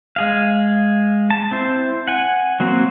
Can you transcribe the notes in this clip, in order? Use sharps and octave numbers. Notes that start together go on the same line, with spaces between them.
G#3 G#4 F5
A5
C4 E4 C5
F#5 G#5
F#3 A#3 C4 F#4